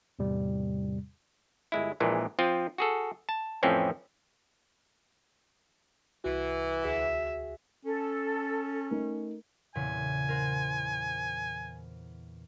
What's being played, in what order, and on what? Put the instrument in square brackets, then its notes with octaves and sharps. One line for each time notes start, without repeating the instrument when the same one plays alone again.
[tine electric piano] E2 A2 C3 G3
[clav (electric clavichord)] G1 G#3 E4
A#1 A#2 E3 G#3
F3 C4 F4
F#4 G#4 A4
A5
F2 A2 E3 F3 C4 C#4
[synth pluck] C2 F#4 [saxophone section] E3
[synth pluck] D2 F#4 G#4 [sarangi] E5
[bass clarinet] C#4 [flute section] A4
[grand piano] A3 D#4 A#4
[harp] E2 A#2 C#3 [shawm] G#5
[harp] A#4 C5 F#5